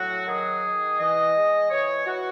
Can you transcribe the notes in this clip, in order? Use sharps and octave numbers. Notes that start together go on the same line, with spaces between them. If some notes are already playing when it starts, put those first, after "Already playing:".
Already playing: A2 F#3 F#4
D#3 G#4
D#3
E3 D#5
G#3
E3 C#5
E3 F#4